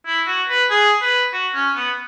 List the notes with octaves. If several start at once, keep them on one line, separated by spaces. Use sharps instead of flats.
E4
F#4
B4
G#4
B4
F#4
C#4
B3